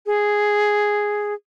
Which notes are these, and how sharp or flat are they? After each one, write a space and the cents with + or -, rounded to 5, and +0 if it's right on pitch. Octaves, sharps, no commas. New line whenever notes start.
G#4 +0